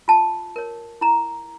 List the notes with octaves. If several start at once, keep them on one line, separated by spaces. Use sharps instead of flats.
F4 A5
A#4 C#5
E4 A#5